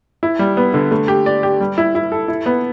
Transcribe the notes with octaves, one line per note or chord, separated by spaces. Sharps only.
E4
G3
B3
D3
A3
G4
D5
G4
G3
E4
E4
A4
E4
B3